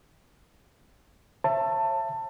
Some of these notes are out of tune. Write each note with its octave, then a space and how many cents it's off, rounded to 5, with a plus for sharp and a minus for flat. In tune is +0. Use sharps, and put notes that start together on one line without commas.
C#5 -40 E5 +25 A5 +20